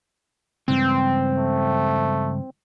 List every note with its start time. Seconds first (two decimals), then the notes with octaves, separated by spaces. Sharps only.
0.68 C#2 G2 E3 C4
1.37 A3